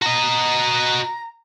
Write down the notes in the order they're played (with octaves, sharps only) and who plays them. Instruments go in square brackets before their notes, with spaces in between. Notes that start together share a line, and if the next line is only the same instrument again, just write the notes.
[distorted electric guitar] F#4 D#5 [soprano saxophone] A#5